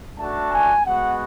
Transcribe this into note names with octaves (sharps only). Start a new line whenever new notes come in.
A3 D4 F#4 A5
G#5
G#3 B3 F#4 F#5